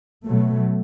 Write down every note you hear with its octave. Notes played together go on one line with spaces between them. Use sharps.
B2 F#3 A3